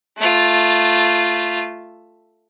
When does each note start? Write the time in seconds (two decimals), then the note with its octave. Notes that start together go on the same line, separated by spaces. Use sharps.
0.18 A3 F4